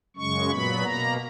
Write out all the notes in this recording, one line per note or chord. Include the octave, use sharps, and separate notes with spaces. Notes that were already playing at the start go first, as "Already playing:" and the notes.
F#2 C#3 G#3 C#6
A#2 F#3 B3 B5
B2 A#3 A#5